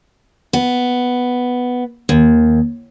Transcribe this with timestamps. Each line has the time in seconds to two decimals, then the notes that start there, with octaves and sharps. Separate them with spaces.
0.53 B3
2.09 D#2